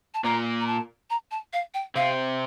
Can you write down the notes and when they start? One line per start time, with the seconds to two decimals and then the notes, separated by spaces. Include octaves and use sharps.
0.14 A5
0.24 A#2 A#3 A#5
0.61 A#5
0.67 A5
1.10 A#5
1.31 A5
1.53 F5
1.74 G5
1.95 C3 C4 F5